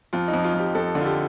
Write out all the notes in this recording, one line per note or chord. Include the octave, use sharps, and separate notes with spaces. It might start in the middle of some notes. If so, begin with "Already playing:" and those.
F2 F4
D#4
F2
F4
F2 G4
F2 A4
D3
F4
G4